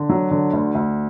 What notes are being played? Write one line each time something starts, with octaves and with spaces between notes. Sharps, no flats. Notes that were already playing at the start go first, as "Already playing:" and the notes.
Already playing: D3
F#3
D3
D2
D2